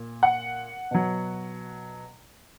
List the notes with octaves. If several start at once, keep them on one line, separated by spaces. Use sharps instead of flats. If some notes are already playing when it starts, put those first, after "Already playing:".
Already playing: A#2
F#5
B2 F#3